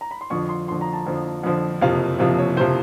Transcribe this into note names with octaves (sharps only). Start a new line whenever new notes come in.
A#5
B5
C6
F2 D3 F3 C#6
C6
F2 D3 F3 C6
A#5
A5
F2 D3 F3
F2 D3 F3
F#1 F2 C3 F3 F5
F#1 F2 C3 F3
C#5
F#1 C3 F3 C5